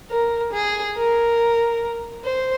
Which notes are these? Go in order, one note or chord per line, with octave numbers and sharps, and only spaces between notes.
A#4
G#4
A#4
C5